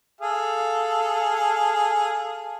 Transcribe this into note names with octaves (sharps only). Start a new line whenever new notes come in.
G#4 A4 F5